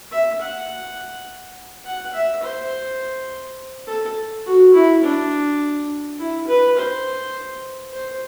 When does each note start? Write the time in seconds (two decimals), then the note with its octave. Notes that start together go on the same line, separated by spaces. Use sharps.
0.12 E5
0.41 F#5
1.85 F#5
2.14 E5
2.43 C5
3.87 A4
4.46 F#4
4.74 E4
5.03 D4
6.18 E4
6.47 B4
6.77 C5
7.93 C5